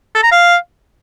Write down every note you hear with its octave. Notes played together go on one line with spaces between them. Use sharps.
A4
A#5
F5